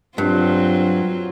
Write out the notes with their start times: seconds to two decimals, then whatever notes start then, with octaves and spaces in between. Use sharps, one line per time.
0.18 G2 F#3 C4 F4